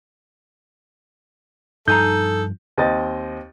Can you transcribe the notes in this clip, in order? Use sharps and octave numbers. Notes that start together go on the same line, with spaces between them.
G2 F3 D#4 A4 G#5 A#5 G6
D#2 C4 D#5 G5 A6